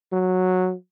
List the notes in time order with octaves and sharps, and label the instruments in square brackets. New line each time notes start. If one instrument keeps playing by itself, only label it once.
[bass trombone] F#3